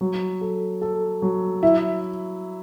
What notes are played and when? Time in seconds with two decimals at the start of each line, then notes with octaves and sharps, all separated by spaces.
0.01 F#3
0.41 A4
0.82 A4
1.22 F#3
1.63 E4